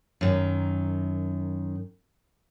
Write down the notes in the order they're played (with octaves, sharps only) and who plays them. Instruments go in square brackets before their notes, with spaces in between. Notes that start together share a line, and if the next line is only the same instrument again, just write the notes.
[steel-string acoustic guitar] F#2 D#3